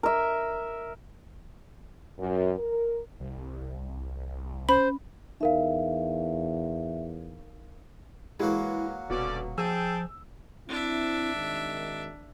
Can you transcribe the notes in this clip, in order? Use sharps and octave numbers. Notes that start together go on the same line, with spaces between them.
A#4 E5
F#2
A#4
C2
C#4 C5 B5
E2 D#4 A#4 E5 F5
E3 F#3 G#3 A#3 E4 F#4
D#1 B2 D3 C#4 D5
F3 G#4 G5 A5 E6
C4 D4 E4 E5
G#1 D#3